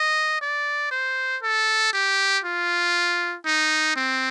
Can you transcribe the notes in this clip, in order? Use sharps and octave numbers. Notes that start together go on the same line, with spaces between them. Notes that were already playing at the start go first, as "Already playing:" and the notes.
Already playing: D#5
D5
C5
A4
G4
F4
D#4
C4